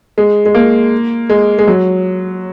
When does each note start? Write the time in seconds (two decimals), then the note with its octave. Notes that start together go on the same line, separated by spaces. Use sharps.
0.18 G#3
0.46 G#3
0.55 A#3
1.30 G#3
1.59 G#3
1.68 F#3